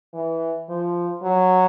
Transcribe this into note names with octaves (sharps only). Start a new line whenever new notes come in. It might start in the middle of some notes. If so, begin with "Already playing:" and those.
E3
F3
F#3